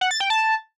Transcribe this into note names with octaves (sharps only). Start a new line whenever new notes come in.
F#5
A6
G5
A5